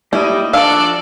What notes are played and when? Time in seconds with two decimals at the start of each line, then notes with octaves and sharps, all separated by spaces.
0.13 A2 F#3 G3 A#3 E4 D#5
0.53 F3 D4 F#4 A4 D5 F5 E6